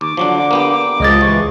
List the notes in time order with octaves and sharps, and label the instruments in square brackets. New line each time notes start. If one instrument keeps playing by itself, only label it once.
[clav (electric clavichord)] D#2 [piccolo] D6
[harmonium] D3 [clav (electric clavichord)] F3 F#3 D4
[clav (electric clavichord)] A#3 B3 G4
[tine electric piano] C#2 G#3 A6 [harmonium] F3 D#5
[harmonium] E3 [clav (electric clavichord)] F3 [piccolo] C#6